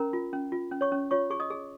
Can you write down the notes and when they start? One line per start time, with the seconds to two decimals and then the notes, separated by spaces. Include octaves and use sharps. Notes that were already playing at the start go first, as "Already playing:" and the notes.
Already playing: C#4 A#4 A#5
0.13 F4
0.33 C#4
0.52 F4
0.71 C#4
0.81 C#5 C#6
0.92 C#4
1.11 F4 C#5 C#6
1.30 G#4 C#6
1.40 D#5 D#6
1.50 G#4